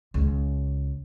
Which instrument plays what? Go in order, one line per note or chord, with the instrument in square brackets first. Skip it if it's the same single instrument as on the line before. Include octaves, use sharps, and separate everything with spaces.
[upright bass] C#2 C#3